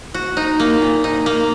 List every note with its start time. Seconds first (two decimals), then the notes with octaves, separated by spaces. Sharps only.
0.14 F#4
0.37 D#4
0.60 A#3
0.82 A#2
1.04 D#4
1.26 A#3